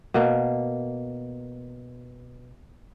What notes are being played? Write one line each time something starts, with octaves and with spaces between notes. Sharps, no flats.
B2 A#3